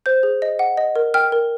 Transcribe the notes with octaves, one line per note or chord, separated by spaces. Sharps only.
C5 G6
G#4
D#5
F#5
D#5
A#4
G5 F6
A#4